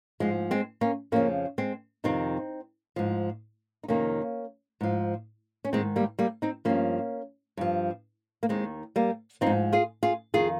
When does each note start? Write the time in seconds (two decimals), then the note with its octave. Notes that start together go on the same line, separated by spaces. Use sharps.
0.20 G#2 F3 G#3
0.51 G#3 C4
0.81 A#3 C#4
1.12 F2 C#3 F3 A#3 C#4
1.58 G#3 C4
2.04 F2 C3 D#3 C4 D#4
2.96 G#2 F3
3.83 D#4
3.88 F2 C3 D#3 A#3 C#4
4.81 G#2 F3
5.64 C#4
5.72 G#2 D#3 G#3 C4
5.96 G3 A#3
6.19 G3 A#3
6.42 C4 D#4
6.65 G2 F3 A#3 C#4
7.57 G2 F3
8.43 A#3
8.49 D#2 D#3 G#3 C4
8.96 G3 A#3
9.41 F3 C4 D#4
9.46 G#2
9.73 F4 G#4
10.03 F4 G#4
10.34 F2 D#3 F4 G#4